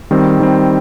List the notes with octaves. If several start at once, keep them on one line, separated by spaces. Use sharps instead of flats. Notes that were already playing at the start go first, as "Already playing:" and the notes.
D#3 G3 C4
D#3 G3 C4